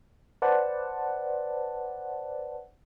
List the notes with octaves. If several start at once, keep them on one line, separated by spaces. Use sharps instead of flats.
B4 C5 D5 F#5 A5